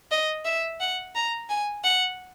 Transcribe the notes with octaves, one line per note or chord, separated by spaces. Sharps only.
D#5
E5
F#5
A#5
G#5
F#5